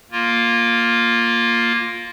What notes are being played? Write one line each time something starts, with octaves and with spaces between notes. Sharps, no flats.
A#3 F4